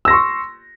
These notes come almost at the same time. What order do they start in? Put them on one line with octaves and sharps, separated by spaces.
E6 A#6 C6 C#6